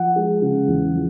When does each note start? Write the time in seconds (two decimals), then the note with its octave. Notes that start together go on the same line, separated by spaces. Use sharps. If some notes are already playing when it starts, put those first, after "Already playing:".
Already playing: F3 F#5
0.16 G#3
0.42 C#3
0.68 E2
0.94 F3